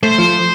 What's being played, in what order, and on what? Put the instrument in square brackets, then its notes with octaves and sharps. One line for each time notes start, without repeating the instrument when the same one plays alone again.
[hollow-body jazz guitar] A3 [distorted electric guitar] C5
[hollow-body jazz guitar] F3